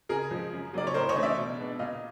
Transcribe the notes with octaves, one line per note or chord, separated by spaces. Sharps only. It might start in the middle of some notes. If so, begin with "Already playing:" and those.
C#3 G#4 A#4
F3 G#3
F#2
C#3 F#3 A#3 D#4 D5
C#5
A2 A#4 C5
C#5 D#5
E3 A3 D4
D5 E5
B2
G#3 B3 D4
A#2 D#5 F5